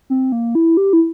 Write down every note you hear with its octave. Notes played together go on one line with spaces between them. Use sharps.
C4
A#3
E4
G4
E4